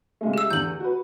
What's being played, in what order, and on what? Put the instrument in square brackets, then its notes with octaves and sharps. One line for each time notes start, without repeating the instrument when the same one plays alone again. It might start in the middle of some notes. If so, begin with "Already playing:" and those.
[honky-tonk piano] C#3 G#3 A3
[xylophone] G4 E6
[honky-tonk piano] E2 D3 [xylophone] G6 F#7
[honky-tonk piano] F#4 B4